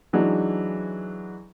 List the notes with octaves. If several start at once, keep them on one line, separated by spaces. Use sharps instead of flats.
E3 F#3 G#3 D4 D#4